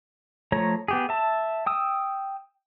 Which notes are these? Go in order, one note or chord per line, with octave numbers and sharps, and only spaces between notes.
F3 A3 C#5 A#5
B3 G4 G#4
E5 A5
G5 D#6 E6